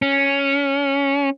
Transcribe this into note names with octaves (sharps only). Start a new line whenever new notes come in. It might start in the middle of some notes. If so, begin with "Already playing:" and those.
C#4